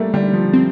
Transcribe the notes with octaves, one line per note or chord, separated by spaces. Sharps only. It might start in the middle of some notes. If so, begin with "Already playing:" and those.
Already playing: G3 A3 A#3
D3 G3
F3
C4